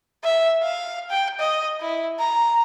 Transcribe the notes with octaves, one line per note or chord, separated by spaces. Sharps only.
E5
F5
G5
D#5
E4
A#5